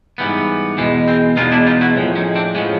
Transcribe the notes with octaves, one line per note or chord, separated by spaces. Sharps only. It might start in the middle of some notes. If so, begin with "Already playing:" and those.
G#2 E3 G3 B3
E2 B2 G#3
C4
E2 B2 G#3 D#4 F4
D4 E4
D#4 F4
E4 F#4
A2 F3 G#3
C#4 D#4
C4 D4
A2 F3 G#3 B3 C#4